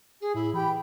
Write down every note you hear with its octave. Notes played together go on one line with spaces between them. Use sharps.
G#4
A2 E4
E3 G4 G5 B5